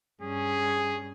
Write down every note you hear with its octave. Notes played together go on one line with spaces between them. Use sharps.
G2 C#4 G#4